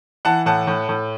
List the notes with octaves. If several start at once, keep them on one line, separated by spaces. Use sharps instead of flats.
E3 F#5 A5
A2 F#5 A5
A2
A2